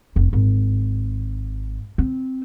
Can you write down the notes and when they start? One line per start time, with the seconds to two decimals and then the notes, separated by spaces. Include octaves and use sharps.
0.16 F1 A3
0.33 G#1
1.98 C4